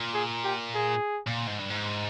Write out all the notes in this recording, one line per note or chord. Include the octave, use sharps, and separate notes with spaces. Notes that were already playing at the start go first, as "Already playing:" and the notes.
Already playing: A#2
G#4
G4
G#4
A#2
G#2
G2
G#2